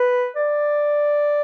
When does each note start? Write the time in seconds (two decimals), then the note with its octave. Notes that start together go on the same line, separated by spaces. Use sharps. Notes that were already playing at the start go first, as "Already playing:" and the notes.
Already playing: B4
0.36 D5